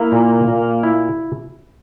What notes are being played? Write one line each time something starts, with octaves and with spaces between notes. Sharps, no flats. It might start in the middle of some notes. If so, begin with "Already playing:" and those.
Already playing: A#3 E4
A#2
A#2
E4